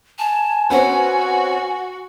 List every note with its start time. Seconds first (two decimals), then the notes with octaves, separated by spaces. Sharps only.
0.19 G#5 A5
0.70 C4 C#4 F#4 B4 F#5